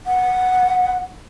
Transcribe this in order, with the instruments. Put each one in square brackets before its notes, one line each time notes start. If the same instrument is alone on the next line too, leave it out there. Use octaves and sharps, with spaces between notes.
[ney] F#5